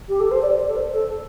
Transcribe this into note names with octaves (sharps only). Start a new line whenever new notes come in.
G4
A4
C5
D5
D5
A4
C5
A4